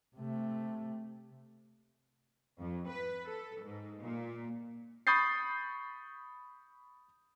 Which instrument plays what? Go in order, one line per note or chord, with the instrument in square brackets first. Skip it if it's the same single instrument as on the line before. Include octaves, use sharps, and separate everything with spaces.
[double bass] C3 A3
[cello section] F2
B4
A4
G#2
A#2
[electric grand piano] B5 C#6 D#6 G6 A6 C7